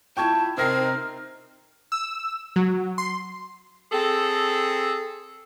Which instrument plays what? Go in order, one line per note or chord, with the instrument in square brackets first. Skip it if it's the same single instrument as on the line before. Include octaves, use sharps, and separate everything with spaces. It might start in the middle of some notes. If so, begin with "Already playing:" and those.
[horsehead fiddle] E4 F4 [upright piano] G5 C#6 G#6 [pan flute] A5
[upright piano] C3 A#6 C7 [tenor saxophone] C4 [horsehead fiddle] D#4 A#4 [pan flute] F6
[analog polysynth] E6
F#3
C6
[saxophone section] C4 G#4 A4